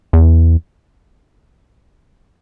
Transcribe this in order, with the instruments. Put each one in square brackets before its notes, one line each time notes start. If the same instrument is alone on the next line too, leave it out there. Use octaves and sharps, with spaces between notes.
[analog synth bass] E2